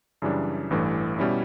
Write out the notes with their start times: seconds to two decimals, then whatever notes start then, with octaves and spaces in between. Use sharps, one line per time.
0.22 F#2 C#3 E3 G3 D4
0.70 A1 G2 E3 A3
1.18 B2 G3 C#4 E4